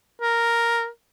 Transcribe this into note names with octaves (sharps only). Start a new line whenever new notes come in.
A#4